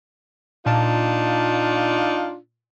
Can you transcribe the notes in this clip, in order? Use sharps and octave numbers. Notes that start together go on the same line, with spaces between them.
A#2 D4 D#4 F4 A5